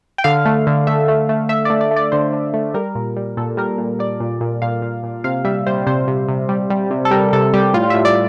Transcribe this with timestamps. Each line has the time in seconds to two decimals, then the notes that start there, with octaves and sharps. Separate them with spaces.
0.18 G5
0.24 D3 F5
0.46 A3
0.67 D3
0.87 A3 E5
1.08 A3
1.29 A3
1.49 A3 E5
1.65 A3 D5
1.81 D5
1.91 A3
1.96 D5
2.12 D3 C5
2.33 D3
2.54 A3
2.74 G3 A#4
2.95 A#2
3.16 G3
3.37 A#2 A4
3.57 G3 A#4
3.78 A#2
3.99 G3 D5
4.20 A#2
4.41 A#2
4.62 A#2 F5
4.82 A#2
5.03 A#2
5.24 C3 F5
5.45 G3 E5
5.67 G3 C5
5.87 C3 C5
6.08 C3
6.28 C3
6.49 G3
6.70 G3
6.91 C3
7.05 A4
7.11 G3 A#4
7.33 C3 A4
7.53 G3 G4
7.74 A2 F4
7.90 A2 E5
8.05 D5